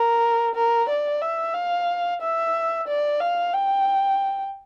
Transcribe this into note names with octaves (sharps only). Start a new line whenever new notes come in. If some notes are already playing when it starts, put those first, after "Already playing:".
Already playing: A#4
A#4
D5
E5
F5
E5
D5
F5
G5